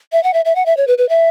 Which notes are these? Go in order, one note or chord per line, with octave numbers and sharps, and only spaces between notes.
E5
F#5
E5
E5
F#5
E5
C#5
B4
B4
E5